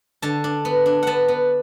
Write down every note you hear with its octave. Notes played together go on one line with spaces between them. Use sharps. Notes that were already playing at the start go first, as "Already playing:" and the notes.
D3 A5
D4
B3
D4
B3 F#5 A5
B3